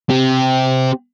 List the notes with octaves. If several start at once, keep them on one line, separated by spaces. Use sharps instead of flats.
C4 G4